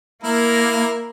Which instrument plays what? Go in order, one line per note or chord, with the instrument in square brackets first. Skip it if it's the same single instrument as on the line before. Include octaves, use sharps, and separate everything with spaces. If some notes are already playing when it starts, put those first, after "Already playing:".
[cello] A#3 [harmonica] E4 A#4